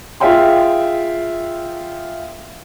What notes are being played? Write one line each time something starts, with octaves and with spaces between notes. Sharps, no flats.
F4 G#4 E5 F5 G5 C6